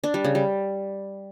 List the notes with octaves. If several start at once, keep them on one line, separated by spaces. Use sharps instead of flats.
D4
G3
C#3
G3